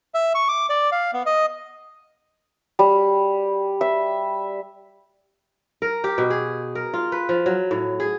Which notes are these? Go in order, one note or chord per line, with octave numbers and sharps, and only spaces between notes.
E5
C#6
D6
D5
F5
B3
D#5
G3
E5
A#4
G4
B2
G#4
A#4
F4
B4
F3
F#3
A2
G#4